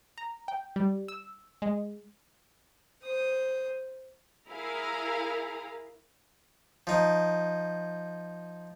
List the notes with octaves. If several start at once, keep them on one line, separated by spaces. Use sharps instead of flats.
A#5
G5
G3
E6
G#3
C5 D#6
E4 G#4 A#4 F5 A#5 B5
F3 D#4